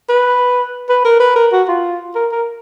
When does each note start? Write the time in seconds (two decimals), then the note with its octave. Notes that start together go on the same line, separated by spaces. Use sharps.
0.09 B4
0.89 B4
1.05 A#4
1.20 B4
1.36 A#4
1.52 F#4
1.68 F4
2.15 A#4
2.32 A#4